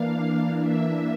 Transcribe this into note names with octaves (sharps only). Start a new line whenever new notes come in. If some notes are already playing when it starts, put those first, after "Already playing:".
Already playing: E3 A#3 D4 F5
E5